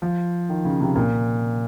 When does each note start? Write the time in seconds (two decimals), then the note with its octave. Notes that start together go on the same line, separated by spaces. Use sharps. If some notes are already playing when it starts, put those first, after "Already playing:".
0.02 F3
0.49 D#3
0.65 C#3
0.81 C3
0.96 A#2